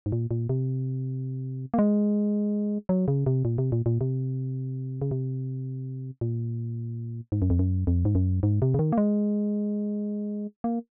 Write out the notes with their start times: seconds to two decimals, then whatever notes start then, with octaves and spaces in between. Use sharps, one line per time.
0.06 G#2
0.12 A#2
0.31 A#2
0.49 C3
1.74 A#3
1.79 G#3
2.89 F#3
3.08 C#3
3.26 C3
3.45 A#2
3.58 C3
3.72 A#2
3.86 A#2
4.01 C3
5.02 C#3
5.11 C3
6.21 A#2
7.32 G#2
7.42 F#2
7.50 F2
7.59 F#2
7.87 F2
8.05 G#2
8.15 F#2
8.43 G#2
8.62 C3
8.74 C#3
8.79 D#3
8.92 A#3
8.98 G#3
10.64 A#3